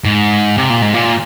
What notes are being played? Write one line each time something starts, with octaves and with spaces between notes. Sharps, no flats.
G#2
C3
A#2
G#2
A#2